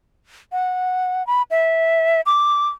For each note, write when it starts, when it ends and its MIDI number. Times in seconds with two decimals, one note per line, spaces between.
0.52 1.26 78
1.27 1.42 83
1.51 2.21 76
2.26 2.67 86